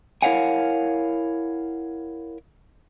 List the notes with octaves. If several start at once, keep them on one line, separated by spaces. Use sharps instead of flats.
E4 A#4 C#5 F5 F#5 G#5